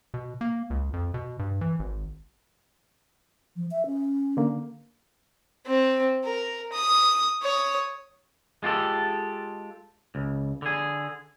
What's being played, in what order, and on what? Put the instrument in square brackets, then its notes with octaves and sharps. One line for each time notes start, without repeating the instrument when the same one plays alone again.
[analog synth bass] B2
A#3
C#2
F2
B2
G2
E3
G#1
[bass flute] F3
E5
C#4
[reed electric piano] D3 A#3
[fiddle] C4
A#4
D#6
C#5 D#6
[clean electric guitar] G#3 F4 G4 A4
C#2
D3 G#4